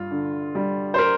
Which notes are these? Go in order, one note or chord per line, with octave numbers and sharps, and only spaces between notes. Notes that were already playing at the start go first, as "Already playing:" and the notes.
Already playing: G2 F4
D3
G3
C5
A#4